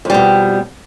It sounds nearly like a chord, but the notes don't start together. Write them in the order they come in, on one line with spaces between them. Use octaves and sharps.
F2 G3 B2